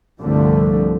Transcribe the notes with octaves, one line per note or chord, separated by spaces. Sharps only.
C2 G2 D3 F3 A3